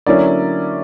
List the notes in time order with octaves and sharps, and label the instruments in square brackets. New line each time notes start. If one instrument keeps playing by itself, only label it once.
[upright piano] D3 F#3 A#3 C#4 E4 D5